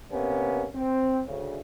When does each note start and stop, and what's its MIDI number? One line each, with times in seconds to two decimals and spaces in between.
0.12 0.66 48
0.12 0.66 58
0.12 0.66 59
0.12 0.66 61
0.75 1.21 60
1.27 1.59 38
1.27 1.59 49